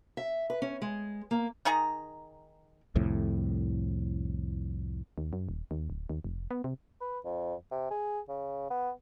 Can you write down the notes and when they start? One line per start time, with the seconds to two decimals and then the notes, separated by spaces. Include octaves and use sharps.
0.17 E5
0.50 B4
0.62 C#4
0.82 G#3
1.31 A#3
1.65 D#3 D#4 G#4 A#5
2.95 C2 F2 A2
5.18 D#2
5.33 F#2
5.49 D#1
5.71 D#2
5.90 D1
6.09 D#2
6.24 F1
6.51 B3
6.64 C3
7.01 B4
7.24 F2
7.71 C3
7.91 G#4
8.29 C#3
8.70 B3